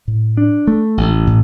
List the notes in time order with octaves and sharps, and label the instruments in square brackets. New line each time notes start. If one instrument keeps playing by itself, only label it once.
[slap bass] A2
D4
A3
A1
A2